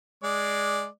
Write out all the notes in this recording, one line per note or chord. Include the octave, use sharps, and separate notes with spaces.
G#3 D5